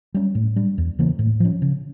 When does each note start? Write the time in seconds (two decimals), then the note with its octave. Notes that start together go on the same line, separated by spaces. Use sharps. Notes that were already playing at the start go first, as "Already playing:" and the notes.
0.14 G3 C#4
0.35 A2
0.56 G3 D4
0.78 E2
0.99 C#3 E3 A#3
1.19 A2
1.40 F3 C#4
1.62 C#3